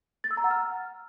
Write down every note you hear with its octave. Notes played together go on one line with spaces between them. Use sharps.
A6
E6
A#5
F#5
F6